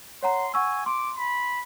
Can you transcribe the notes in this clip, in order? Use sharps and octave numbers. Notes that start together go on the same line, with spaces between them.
C#5 F#5 A#5 C6
F#5 G#5 C#6 E6
C6 D6
B5